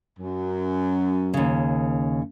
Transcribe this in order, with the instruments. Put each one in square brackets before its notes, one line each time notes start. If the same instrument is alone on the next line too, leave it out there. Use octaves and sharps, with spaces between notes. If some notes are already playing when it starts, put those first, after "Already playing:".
[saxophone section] F#2
[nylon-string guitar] D#2 C#3